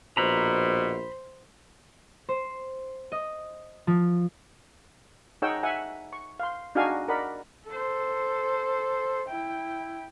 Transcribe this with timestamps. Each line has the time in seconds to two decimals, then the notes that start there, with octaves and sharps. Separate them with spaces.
0.17 A#1 B2 C5 A#5 B5
2.29 C5
3.12 D#5
3.87 F3
5.42 D#4 G#4 C#5 F#5 G5 E6
5.63 E5 F#5 G#5
6.13 C#6
6.40 F5 C6
6.75 D4 D#4 F#4 G#4 F5 G#5
7.08 A#4 D5 D#5 F#5 B5
7.67 A4 C5
9.28 E4 G5